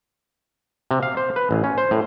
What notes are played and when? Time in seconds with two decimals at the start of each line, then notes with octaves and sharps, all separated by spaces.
0.91 C3
1.03 F5
1.17 C5
1.36 B4
1.51 A1
1.64 C#4
1.78 C5
1.91 A2